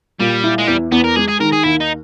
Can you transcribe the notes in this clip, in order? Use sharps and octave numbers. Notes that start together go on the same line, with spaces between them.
A#2 G3
E4
G#3
E2 G3
E2 B3
A#4
G#3 G#4
G#4
D#3 A#4
G#4
D#2 E4
D#4